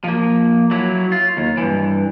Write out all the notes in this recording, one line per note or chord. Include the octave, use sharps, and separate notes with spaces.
F3 A#3
F#3 E4
F4
D#2
G2 E3